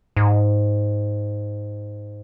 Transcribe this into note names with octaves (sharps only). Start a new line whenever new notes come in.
G#2